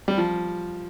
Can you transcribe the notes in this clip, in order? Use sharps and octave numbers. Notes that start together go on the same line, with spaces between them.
G3
F3